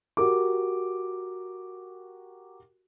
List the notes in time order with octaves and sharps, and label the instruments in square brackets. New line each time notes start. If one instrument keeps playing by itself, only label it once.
[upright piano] F#4 G4 A#4 D6